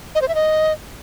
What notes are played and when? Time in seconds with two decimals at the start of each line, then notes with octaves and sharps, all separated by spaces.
0.15 D#5
0.22 C5
0.28 E5
0.35 D#5